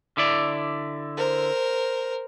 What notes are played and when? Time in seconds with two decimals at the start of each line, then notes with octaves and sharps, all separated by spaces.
0.17 D3 E4 D5
1.17 A#4 C5